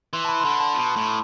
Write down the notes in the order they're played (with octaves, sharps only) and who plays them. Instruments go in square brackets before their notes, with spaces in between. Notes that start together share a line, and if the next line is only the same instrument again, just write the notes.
[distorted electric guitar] E3 [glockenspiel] C6
[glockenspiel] A5
B5
C6
[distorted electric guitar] D3 [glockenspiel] B5
[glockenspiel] A5
[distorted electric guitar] B2 [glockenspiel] B5
[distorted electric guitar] A2